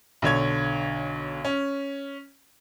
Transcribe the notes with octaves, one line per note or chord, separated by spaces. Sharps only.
B1 D3 C#5 G#6
C#4